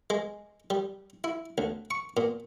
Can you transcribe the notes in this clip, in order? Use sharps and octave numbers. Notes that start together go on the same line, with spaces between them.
G#3
G3
E4
D2
C#6
A#2